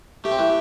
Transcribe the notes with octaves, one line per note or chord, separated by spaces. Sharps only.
A3 G4
C4
E3 A3